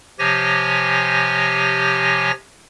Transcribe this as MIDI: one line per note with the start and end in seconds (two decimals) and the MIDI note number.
0.19 2.31 48
0.19 2.31 53
0.19 2.31 67
0.19 2.31 73
0.19 2.31 80
0.19 2.31 94